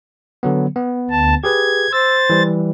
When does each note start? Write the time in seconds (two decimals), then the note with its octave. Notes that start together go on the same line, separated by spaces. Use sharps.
0.43 D3 F#3 B3
0.76 B3
1.10 D2 A5
1.44 G4 G#4 B4 G#6
1.93 C5 E6 A6
2.30 E3 G3